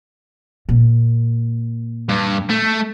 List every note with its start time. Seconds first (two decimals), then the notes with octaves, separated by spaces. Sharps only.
0.69 A#2
2.09 G2
2.50 A3